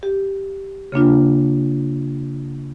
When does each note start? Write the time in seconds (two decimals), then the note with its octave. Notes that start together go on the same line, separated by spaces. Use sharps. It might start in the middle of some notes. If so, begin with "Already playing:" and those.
0.03 G4
0.92 C#3 A#3 D4 F4